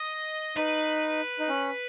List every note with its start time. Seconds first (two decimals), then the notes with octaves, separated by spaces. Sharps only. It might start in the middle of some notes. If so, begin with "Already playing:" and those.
Already playing: D#5
0.57 D#4 B4
1.39 D#4
1.49 C#4